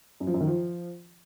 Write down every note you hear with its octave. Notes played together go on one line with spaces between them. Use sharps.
F#2
F3
F#2
D#3
F3